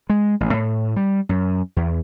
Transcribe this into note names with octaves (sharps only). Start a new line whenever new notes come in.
G#3
A1
A2
G3
F#2
E2